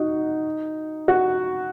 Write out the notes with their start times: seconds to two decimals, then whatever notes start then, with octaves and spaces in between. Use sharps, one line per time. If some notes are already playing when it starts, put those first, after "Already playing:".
Already playing: D#4 F#4
1.08 F#4